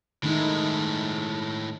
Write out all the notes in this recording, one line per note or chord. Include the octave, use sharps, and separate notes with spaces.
A2 D#3 G#3 D#4 E4